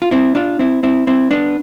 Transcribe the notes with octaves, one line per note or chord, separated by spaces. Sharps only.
F4
C4 E4
D4 F4
C4 E4
C4 E4
C4 E4
B3 D4